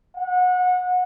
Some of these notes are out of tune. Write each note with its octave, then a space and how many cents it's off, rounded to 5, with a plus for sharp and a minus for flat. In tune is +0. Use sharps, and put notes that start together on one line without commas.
F#5 -25